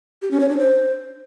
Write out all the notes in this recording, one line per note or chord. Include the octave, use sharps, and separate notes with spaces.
G4
C#4
C#5
D4
C5